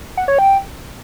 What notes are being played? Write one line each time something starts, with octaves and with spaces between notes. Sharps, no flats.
F#5
C#5
G5